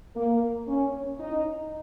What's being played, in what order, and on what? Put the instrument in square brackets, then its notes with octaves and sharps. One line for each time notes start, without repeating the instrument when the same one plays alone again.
[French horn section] A#3
C#4
D#4